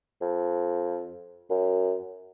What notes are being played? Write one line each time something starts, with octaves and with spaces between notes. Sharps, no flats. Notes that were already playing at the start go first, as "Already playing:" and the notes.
F2
F#2